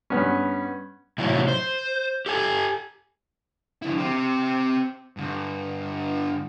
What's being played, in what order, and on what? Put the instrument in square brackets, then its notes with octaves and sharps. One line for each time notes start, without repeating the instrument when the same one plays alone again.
[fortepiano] G2 B3 C#4
[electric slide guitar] A2 C3 E3 F#3
C5
G4 A4 G#5
[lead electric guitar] D3 E4
C4 G4
G2 D3